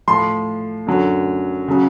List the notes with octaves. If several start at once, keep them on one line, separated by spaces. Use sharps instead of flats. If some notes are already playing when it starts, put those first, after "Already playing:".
A2 F3 C6
F#2 D3 F#3
C#3 F#3